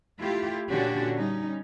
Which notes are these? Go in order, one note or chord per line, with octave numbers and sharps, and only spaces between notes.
A3 E4 F4 G4
A#2 D3 C#4 D4 F#4 G4
G3 C#4 D#4